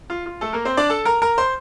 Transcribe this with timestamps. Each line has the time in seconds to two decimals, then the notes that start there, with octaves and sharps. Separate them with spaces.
0.10 F4
0.26 F4
0.41 A3 A4
0.53 A#3 A#4
0.65 C4 C5
0.77 D4 D5
0.89 A4 A5
1.05 A#4 A#5
1.22 A#4 A#5
1.38 C5 C6